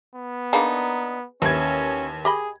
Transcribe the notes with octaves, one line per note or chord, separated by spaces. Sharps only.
B3
A#3 D4 D#4 G#4 B4
D#2 E3 C#4 G#6
G4 G#4 D#5 B5